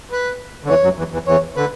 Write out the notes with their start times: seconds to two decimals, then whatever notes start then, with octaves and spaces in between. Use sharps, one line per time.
0.12 B4
0.64 D3
0.69 E2 E3 C#5
0.84 F#2 F#3
0.98 E2 E3
1.13 E2 E3
1.27 E2 E3 C#5
1.57 D3 B4